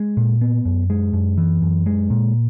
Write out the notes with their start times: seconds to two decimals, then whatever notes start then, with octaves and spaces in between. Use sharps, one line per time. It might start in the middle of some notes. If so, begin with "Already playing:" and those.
Already playing: G#3
0.17 A#2
0.41 B3
0.65 F#2
0.90 G#3
1.13 F#2
1.38 E3
1.62 F#2
1.86 G#3
2.10 A#2